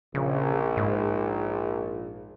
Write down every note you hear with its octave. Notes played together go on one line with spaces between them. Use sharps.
A#1 C#3
G#2